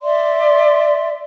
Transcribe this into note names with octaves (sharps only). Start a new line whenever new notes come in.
D5 E5 C6